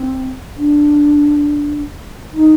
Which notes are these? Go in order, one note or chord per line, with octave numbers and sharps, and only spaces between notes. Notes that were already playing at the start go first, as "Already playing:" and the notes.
Already playing: C4
D4
D#4